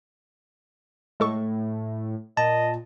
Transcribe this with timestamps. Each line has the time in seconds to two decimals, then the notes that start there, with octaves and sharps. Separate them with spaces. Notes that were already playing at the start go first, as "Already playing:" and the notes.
1.20 A2 G#3 A4 C#6
2.37 A#2 D#5 A5